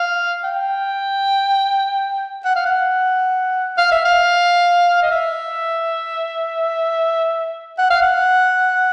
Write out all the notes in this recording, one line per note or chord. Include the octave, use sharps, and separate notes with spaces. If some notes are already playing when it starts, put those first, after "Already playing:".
Already playing: F5
G5
F#5
F5
F#5
F5
E5
F5
D#5
E5
F#5
F5
F#5